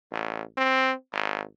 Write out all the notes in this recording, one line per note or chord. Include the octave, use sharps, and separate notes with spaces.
A1
C4
G#1